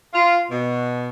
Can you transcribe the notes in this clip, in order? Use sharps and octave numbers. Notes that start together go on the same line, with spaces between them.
F4
B2